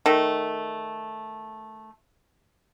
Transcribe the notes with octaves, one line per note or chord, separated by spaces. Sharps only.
D#3 A3